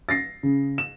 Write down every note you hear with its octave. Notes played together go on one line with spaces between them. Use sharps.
A6 A#6 C7
C#3
E7